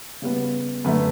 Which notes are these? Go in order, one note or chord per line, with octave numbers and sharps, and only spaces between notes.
C#3 G3 B3
F#2 D3 A3 B4